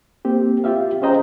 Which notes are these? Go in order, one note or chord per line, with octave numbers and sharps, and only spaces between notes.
A#3 C4 G4
F4 G4 E5 F5
C#4 G#4 C5 D#5 G5 A#5